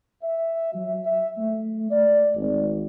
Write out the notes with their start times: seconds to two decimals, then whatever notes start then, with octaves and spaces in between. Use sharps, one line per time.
0.23 E5
0.73 F#3
1.05 E5
1.38 A3
1.91 D5
2.35 G#1